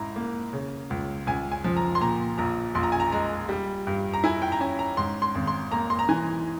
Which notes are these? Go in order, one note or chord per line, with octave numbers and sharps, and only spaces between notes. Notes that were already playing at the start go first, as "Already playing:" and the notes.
Already playing: G#2 E4 A#5
A#3
C#3
C#2
C#2 G#5
G#5
F3
A#5
C6
A#2 A#5
A#1 A#5
A#1 C6
A#5
G#5
A#5
G#3 A#5
G3
G2
A#5
E4 G#5
G5
A#5
C#4 G#5
A#5
G#2 C6
C6
G#1
C6
A#3 A#5
C6
A#5
E3 G#5